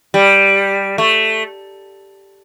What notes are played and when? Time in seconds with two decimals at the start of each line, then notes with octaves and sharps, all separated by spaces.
0.14 G3
0.98 A3